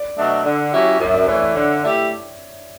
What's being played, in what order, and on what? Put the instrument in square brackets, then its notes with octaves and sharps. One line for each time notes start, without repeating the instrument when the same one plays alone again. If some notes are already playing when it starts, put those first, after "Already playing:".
Already playing: [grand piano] D5
[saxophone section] B2 F#3 A3 D4
D3
F#3 C#4 E4 G4
F#2
[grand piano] E5
D5
[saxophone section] E3 A3 [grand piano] C#5
[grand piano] D5
[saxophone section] D3 [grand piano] C#5
[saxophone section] A3 E4 G4